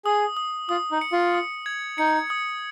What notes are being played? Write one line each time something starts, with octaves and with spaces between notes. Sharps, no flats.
G#4 D#6
D#6
F4 D#6
D#4
C#7
F4
D#6
G#6
D#4 C#7
D#6